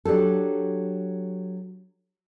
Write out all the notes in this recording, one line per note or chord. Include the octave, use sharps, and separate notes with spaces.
F#3 D4 G4 A4